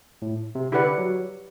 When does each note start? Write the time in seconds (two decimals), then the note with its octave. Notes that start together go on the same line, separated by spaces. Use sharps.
0.22 A2
0.55 C3
0.72 D3 E4 G4 B4 D5 F#5
0.98 F#3